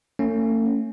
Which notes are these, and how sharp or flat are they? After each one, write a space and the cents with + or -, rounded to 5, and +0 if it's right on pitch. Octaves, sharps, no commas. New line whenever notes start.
A3 +40 C#4 +0